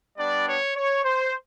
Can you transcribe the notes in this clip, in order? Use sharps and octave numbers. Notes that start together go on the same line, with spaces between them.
G3 B3 D4 D5
C#5
C#5
C5